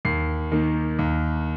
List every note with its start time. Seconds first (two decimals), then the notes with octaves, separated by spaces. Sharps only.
0.05 D#2 C7
0.52 D#3 A#3
0.99 D#2